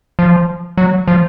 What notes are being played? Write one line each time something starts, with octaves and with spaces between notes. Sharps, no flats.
F3
F#3
F3